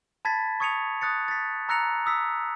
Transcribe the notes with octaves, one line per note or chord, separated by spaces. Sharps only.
A5 B5 G#6 A6 B6
C#6 D#6 G#6 C#7 D#7 F7
D#6 F#6 A6 C#7
A6 B6
A#5 E6 F#6 A#6 C#7 F7
D#6 E6 B6